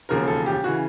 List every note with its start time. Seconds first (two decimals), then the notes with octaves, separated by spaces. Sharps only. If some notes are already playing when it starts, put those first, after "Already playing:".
0.09 E1 D#2 C#3 F3 A#4
0.27 A4
0.46 G4
0.64 C#3 E3 F#4